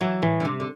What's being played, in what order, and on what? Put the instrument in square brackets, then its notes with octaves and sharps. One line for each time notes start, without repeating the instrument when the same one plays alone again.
[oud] E3 [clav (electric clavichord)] F#3
[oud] A2 [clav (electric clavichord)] E3
[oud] D3
C3
D3